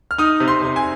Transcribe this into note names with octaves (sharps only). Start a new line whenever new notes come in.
F6
D#4 D#6
C3
C6
C3
G#5